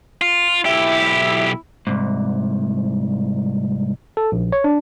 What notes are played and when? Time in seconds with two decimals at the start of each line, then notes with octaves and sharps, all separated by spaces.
0.22 F4
0.65 B1 E4 G4
1.87 C2 G#2
4.17 A4
4.32 A#1
4.52 C#5
4.64 D4